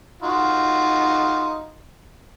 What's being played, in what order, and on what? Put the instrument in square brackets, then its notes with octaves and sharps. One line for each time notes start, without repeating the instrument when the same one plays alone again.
[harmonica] D#4 F4 F#4